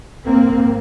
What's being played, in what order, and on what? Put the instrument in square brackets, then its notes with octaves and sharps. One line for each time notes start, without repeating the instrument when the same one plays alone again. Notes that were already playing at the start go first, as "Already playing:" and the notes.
[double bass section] G#1 G#2 A#3 C4